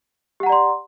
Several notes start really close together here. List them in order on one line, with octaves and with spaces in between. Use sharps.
G4 F#5 A#5 D5 C6